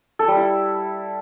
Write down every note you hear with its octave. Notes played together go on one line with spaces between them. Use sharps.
A4
G3
E4